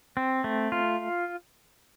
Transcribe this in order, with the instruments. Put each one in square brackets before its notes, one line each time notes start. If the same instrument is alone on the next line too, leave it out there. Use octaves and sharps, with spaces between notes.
[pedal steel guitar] C4
A3
F4